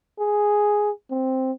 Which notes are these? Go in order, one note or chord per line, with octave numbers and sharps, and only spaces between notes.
G#4
C4